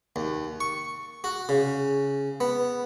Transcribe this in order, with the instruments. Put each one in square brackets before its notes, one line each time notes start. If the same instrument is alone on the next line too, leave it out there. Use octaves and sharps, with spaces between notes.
[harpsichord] D#2
C#6
F#4
C#3
B3